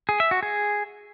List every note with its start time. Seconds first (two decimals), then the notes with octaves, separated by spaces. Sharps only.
0.09 G#4
0.20 E5
0.31 F#4
0.43 G#4